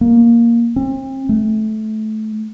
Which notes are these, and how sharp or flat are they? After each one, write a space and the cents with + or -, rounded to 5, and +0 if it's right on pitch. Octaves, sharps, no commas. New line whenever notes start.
A#3 +5
C4 +40
A3 -20